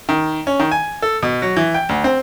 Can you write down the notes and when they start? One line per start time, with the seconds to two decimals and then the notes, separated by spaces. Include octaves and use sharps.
0.09 D#3
0.47 C#4
0.60 D#3
0.71 G#5
1.02 A4
1.23 B2
1.42 F#3
1.57 E3
1.74 G5
1.89 D2
2.04 C4